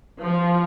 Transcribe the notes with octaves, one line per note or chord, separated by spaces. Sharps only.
F3